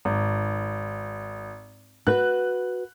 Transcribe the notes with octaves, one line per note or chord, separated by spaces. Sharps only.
G#1
F#4 B4 F#6